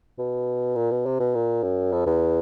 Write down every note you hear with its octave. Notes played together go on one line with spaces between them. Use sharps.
B2
A#2
B2
C3
B2
A#2
F#2
F2
E2